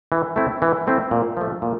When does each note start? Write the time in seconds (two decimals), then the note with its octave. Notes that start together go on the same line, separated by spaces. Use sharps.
0.12 E3
0.36 A3 C4 E4
0.62 E3
0.87 A3 C4 E4
1.11 A#2
1.37 F3 A3
1.62 A#2